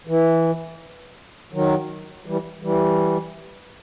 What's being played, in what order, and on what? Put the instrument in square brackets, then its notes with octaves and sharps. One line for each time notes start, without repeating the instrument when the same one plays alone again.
[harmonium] E3
D#3 F#3
E3 G3
E3 G3